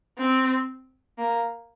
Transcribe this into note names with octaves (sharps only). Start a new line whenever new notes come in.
C4
A#3